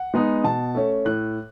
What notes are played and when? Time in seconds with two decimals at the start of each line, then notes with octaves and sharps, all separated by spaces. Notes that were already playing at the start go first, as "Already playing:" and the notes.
Already playing: F#5
0.14 G#3 B3 D#4
0.44 B2 A5
0.75 A3 C#4
1.05 A2 F#6